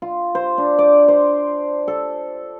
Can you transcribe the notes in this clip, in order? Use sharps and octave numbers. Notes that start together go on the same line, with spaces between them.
F4
C5
D4
D5
C5
A4